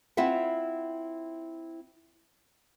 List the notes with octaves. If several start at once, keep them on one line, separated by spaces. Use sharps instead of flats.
C4 E4 F4 E5 F#5